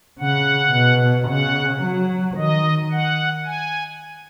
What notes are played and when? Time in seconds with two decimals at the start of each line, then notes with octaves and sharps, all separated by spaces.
0.19 C#3 F#5
0.73 B2
1.28 C#3 F#5
1.82 F#3
2.36 D#3 D#5
2.91 F#5
3.45 G#5